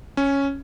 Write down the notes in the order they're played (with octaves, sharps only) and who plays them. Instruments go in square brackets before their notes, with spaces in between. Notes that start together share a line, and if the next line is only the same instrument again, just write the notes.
[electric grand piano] C#4